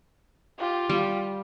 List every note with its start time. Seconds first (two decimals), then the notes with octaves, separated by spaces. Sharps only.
0.59 F4 G4
0.90 G3